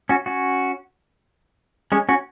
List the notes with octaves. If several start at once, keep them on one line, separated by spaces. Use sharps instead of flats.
C#4 F#4
C#4 F#4
G#3 C#4
C#4 F#4